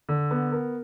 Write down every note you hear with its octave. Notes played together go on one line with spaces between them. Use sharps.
D3
B3
A#4